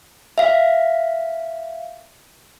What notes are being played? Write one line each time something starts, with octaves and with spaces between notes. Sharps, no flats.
E5 F5